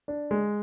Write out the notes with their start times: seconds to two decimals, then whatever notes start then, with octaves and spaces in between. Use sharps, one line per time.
0.08 D4
0.31 G#3